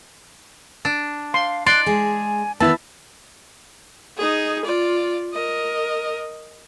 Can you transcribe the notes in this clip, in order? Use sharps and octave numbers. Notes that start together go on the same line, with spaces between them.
D4
F5 C6
D#4 D5 C6 F#6
G#3 G#4 G#5
D#3 B3 E4 A5 E6
D#4 G#4
F4 D5
A#4 D#5